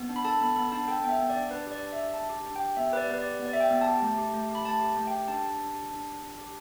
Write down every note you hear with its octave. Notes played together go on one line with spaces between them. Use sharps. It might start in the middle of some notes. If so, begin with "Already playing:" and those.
Already playing: B3
D4
B5
A4 A5
B3 B5
B3 B5
D4 A5
A4 G5
B3 G5
E5
B3
D5
D4
D4 B4
G4 D5
D4
E5
G4
D4 A5
G4
D4
G4 G5
B3 E5
G4 B4 D5
B3 B4
D5
G4
B3
D5
G4 E5
G5
B3
A5
G4
A3
G4
A3
G4
B5
A3 A5
G4
A3
G5
G4
D4 A5
G4
D4
G4
D4
G4
D4
G4